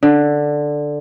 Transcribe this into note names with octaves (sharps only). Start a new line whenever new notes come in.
D3